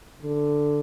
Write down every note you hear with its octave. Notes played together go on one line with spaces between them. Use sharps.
D3